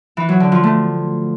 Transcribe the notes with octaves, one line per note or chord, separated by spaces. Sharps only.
E3
F#3
D3
F3
A3